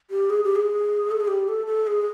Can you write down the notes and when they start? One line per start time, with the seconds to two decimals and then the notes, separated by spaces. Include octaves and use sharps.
0.11 G4
0.30 G#4
0.44 G4
0.56 G#4
1.11 A4
1.20 G#4
1.28 G4
1.48 A4
1.67 A4
1.87 G#4